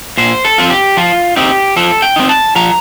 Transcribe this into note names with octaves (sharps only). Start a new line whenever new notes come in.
A#2 C5
A4
F3 C4 F4
G4
F3 F4
C4 D#4 G4
F3 A4
G5
C4 D#4
A5
F3 A#5